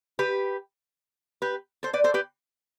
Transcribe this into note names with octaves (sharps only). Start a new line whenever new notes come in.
G4 B4
G4 B4
A4 C5
B4 D5
A4 C5
G4 B4